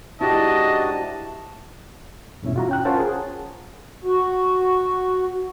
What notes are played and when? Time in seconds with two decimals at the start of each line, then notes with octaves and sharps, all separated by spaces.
0.21 G#2 D4 E4 F#4 G4 D#5 A5
2.42 E2 G2 B2 C#4 E4
2.56 F4 F#4 A#5
2.69 C#4 G5 F#6
2.85 C#4 F4 A#4 C5 F#5 A5
2.99 G#4
4.04 F#4